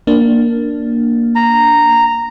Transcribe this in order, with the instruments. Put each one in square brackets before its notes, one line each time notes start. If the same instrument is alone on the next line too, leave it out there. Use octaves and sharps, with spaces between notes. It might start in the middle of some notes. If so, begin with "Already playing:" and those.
[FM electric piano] A#3 D4
[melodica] A#5